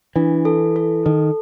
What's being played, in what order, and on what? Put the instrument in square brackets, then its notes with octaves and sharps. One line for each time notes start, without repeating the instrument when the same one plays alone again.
[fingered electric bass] E3 [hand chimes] D4
[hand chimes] A4
A4
[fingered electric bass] D#3 [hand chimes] A4